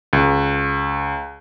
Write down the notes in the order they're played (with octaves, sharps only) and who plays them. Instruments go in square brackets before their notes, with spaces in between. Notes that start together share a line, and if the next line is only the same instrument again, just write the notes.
[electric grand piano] C#2